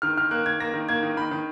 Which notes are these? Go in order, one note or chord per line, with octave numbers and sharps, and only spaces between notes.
D#3 F6
D#3 F6
A#3 F#6
D#3 G#6
A#3 A#6
D#3
A#3 G#6
D#3
D#3 B5
D#3